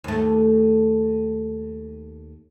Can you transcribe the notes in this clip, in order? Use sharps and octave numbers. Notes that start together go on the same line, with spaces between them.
D#2 A3